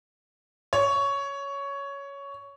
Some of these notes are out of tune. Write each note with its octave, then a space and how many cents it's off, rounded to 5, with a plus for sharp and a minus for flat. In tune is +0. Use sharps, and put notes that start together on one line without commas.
C#5 +10